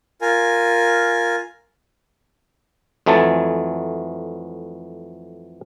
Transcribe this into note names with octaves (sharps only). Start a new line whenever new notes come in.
F4 A#4 G#5
F2 E3 F#3 A3 G#5 A5